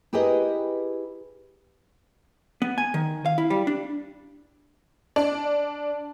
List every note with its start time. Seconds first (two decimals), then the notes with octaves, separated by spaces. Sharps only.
0.13 E4 G4 G#4 A#4 B4 D#5
2.62 B3
2.78 G#5
2.94 D#3
3.26 F5
3.38 E4
3.50 G3
3.67 D4
5.16 D4